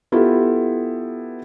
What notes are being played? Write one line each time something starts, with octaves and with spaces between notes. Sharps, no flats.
B3 E4 F4 G4 A4